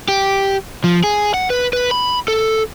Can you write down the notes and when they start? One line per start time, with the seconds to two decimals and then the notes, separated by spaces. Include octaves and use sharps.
0.08 G4
0.84 F3
1.04 G#4
1.34 F#5
1.50 B4
1.73 B4
1.91 B5
2.28 A4